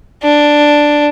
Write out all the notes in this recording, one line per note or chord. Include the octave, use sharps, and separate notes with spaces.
D4